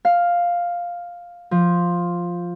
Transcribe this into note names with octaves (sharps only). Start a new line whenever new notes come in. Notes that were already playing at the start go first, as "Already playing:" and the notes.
F5
F3